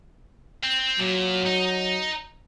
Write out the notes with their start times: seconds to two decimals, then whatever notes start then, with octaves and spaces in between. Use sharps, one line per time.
0.63 C4
0.99 A#2 F#3
1.46 D#4